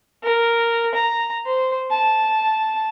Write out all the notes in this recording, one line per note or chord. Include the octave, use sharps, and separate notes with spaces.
A#4
A#5
C5
A5